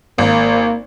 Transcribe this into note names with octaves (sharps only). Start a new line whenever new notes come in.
G#1 A#3